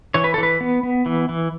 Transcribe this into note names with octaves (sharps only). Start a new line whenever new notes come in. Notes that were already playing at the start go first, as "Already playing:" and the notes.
E3 C#5
B4
A4
E3
B4
B3
B3
E3
E3